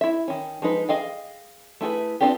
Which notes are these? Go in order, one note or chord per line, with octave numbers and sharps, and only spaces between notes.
E4 E5
D#3 C#4
F3 G#3 D#4 B4
G#4 D#5 F5 G5
A3 E4 G#4 B4
B3 C4 D4 F4 G4